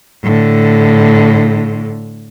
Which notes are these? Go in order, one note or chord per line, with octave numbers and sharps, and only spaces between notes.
A2 D3